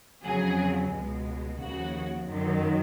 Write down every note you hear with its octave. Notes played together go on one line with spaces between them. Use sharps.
F2 C#3 F#3 G#4
C#2 B2 G#3
D#2 C#3 F3 F#4
F#2 D#3 F#3